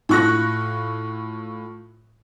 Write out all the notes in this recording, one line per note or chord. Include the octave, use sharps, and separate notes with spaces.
A2 F4 C#6 F#6 A#6